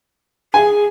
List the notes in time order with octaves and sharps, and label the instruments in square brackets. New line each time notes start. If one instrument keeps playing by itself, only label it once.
[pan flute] G#4 [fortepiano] G#5